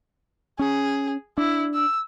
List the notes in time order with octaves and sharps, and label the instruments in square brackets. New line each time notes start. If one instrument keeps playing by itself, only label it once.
[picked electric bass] C#4 [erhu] G#4
[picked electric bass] D4 [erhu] E4
[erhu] E6